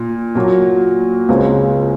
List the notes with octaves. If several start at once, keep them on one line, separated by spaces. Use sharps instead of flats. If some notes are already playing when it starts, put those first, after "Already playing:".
Already playing: A#2
A#2 F#3 A#3
C#2 C#3 G#3 C4